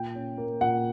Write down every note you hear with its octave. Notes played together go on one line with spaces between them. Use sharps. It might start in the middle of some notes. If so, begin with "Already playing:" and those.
Already playing: A#2 G5
C#4
A#3
A#2 F#5